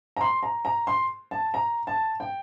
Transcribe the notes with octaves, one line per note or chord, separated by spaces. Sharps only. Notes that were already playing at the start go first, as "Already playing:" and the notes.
A#5
C6
A#5
A#5
C6
A5
A#5
A5
G5